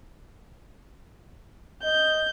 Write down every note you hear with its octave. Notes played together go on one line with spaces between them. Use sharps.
D#5 G6